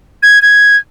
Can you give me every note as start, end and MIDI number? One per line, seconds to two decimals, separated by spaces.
0.23 0.41 92
0.42 0.77 92